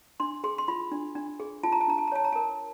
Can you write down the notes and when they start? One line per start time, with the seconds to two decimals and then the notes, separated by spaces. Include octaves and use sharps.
0.20 D4 C6
0.44 G#4 C6
0.58 C6
0.68 F4 B5
0.92 D4
1.15 D4
1.40 G#4
1.63 F4 A5
1.72 A#5
1.81 A5
1.88 D4 A#5
1.98 A5
2.07 A#5
2.12 C#5 A5
2.24 A#5
2.32 A#4 A5